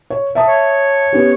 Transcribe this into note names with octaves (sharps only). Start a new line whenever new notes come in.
C#5
E5 A5 D#6
C#5
B3 C#4 G4